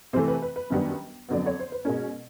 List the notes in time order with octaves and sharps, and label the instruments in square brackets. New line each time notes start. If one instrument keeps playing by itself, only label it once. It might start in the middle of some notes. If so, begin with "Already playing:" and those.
[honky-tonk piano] C3 C5
E3 A3
B4
B4
B4
F#2 D#3 G3 B3 D4
F2 D3 F#3 B3 D5
C#5
C5
B4
B2 G#3 C#4 A#4